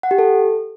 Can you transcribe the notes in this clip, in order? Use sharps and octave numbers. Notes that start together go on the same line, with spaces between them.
F#5
G4
A4